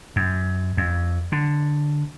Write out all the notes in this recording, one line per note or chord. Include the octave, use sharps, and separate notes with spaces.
F#2
F2
D3